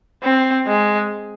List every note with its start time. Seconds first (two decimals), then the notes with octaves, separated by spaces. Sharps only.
0.23 C4
0.67 G#3